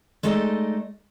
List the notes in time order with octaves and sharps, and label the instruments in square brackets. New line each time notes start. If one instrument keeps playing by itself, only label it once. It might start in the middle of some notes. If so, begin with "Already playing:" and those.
[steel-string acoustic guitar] G#3 A3 D#4 A4 D5 D#5